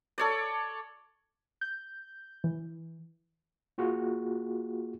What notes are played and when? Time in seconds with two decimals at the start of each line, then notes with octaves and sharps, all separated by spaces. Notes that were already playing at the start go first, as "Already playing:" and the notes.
0.18 A4 C#5 D5
1.61 G6
2.44 E3
3.78 A#3 F4 F#4 G#4